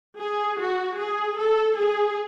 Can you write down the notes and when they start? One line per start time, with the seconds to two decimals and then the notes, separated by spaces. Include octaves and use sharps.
0.19 G#4
0.59 F#4
0.98 G#4
1.38 A4
1.78 G#4